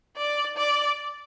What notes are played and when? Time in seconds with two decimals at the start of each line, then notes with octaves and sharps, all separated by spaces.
0.17 D5
0.57 D5